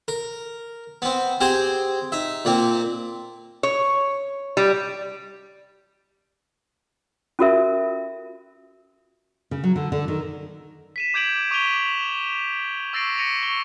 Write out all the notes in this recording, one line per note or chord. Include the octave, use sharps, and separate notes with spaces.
A#4
B3 C4
C4 G4 G#4 C5
D#4 E5
A#2 A#3 C4
C#5
G3
C#4 F4 F#4 A4 A#4 E5
C#3
F#3
D3
D3
D#3
B6 D#7 E7
D6 G6 G#6 D7 F#7
C#6 D6 D7 D#7 F7 G7
C#6 E6 A6 A#6 C7 D7
A#6 C#7 D#7 F7
C#6 G7